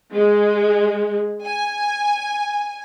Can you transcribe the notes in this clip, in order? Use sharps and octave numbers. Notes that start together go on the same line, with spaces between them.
G#3
G#5